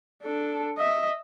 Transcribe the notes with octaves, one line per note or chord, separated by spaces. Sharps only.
D4 A4
D#5 E5